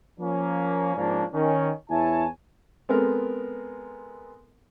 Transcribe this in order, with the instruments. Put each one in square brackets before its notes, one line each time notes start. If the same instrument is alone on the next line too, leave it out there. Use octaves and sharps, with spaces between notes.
[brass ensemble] F3 A#3 C#4
G#2 F3 A#3 C#4 D4
D#3 C#4
E2 E4 C#5 G#5 A5
[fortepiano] G#3 B3 C4 A4 A#4